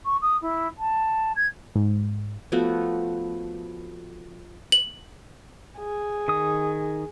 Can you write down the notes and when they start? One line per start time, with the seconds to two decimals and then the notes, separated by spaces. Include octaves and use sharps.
0.05 C#6
0.21 D#6
0.42 E4
0.78 A5
1.36 G#6
1.76 G#2
2.52 F3 A3 B3 F#4
4.72 F#7
5.78 G#4
6.28 D#3 D#6